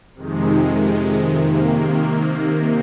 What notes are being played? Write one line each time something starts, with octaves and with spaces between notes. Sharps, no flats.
F2 C3 D#3 G#3
C3 D#3 A#3